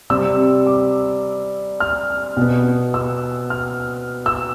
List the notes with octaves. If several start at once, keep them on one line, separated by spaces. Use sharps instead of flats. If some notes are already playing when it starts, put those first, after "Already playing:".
C3 G3 C4 E6
D6
F6
B2 B3
E6
F6
E6